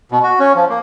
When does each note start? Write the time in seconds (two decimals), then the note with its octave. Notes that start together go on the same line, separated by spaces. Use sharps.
0.12 B2
0.23 F#4
0.39 C#4
0.55 F3
0.70 A#3